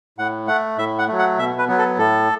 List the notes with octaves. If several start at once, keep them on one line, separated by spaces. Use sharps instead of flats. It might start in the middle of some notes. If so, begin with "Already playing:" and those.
A2 F#5
A3 F#5
A2 E5
F#5
F#3 A3
F#5
B2 E5
B4
F#3 B3
A4
A2 A4